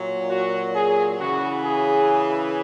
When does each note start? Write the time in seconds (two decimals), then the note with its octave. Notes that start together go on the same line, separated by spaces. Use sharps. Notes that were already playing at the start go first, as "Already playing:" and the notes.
Already playing: A#2 F#3
0.29 F#4
0.75 G#4
1.19 C#3 E3 F#4
1.64 G#4